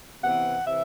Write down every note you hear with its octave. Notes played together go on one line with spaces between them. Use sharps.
C3 E3 B3 F#5
C3 E3 E5